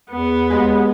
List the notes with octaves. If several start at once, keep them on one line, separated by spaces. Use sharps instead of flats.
E2 B3
D#2 G#3